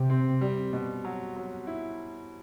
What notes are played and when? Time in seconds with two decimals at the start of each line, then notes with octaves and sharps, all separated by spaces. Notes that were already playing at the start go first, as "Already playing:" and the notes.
Already playing: C3 G4
0.10 C4
0.41 G3
0.73 B2
1.05 F#3
1.36 F#3
1.67 E4